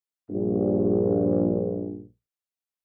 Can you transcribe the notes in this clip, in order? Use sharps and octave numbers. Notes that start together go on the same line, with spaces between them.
A#1 G2